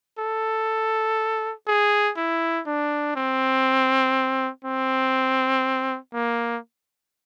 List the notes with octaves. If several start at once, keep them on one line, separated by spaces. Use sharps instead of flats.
A4
G#4
E4
D4
C4
C4
A#3